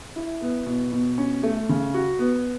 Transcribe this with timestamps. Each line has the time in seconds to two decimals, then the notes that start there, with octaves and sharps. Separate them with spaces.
0.16 E4
0.42 B3
0.66 B2
0.92 B2
1.18 C#4
1.43 A3
1.69 C#3
1.94 F#4
2.19 B3